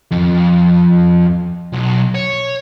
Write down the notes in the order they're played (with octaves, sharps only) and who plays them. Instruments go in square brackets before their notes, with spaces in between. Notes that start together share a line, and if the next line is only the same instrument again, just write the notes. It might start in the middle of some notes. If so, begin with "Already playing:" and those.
[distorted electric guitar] F2
B1
C#5